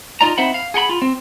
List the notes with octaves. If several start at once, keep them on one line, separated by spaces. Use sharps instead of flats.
D#4 F4 D5 A#5
C4 D#4 C5 E5 F#5 B5
F5
G#4 F#5 G5 B5
F4
C4